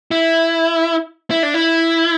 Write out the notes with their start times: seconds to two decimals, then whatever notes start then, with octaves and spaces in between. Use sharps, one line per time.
0.11 E4
1.31 E4
1.43 D4
1.54 E4